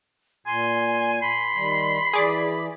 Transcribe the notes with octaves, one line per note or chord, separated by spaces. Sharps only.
A#2 G#5 C6
B5 C6
D#3 G3
E3 G#4 D5